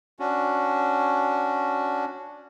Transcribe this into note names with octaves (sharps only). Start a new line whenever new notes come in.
C#4 D4 F#4